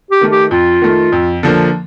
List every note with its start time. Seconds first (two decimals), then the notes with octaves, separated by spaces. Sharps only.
0.11 G4
0.21 D#3 A3
0.31 G4
0.51 F2 F4
0.82 D#3 A3
1.12 F2
1.43 D3 F3 A#3